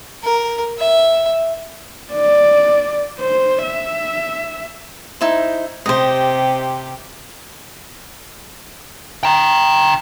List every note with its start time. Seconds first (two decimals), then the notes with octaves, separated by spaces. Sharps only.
0.24 A#4
0.78 E5
2.14 D5
3.19 C5
3.63 E5
5.21 D#4 E4 C5
5.86 C3 G4 C5 D#5
9.23 G5 A#5